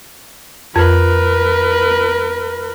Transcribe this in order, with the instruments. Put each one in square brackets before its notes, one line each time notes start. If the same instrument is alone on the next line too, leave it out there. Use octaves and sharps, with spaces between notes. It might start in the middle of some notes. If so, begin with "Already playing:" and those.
[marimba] F2 [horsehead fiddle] A#4 B4